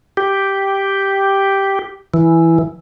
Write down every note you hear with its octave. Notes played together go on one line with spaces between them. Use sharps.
G4
E3